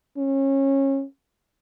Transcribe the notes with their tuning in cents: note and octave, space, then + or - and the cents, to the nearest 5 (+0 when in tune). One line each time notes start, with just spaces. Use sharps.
C#4 -25